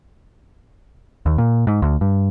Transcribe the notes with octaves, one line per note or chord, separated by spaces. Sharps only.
D#2
A#2
G#2
D2
G2